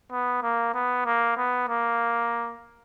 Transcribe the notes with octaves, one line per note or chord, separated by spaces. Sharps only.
B3
A#3
B3
A#3
B3
A#3